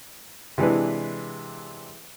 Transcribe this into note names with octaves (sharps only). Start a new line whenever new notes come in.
C3 E3 G#3 D4 B4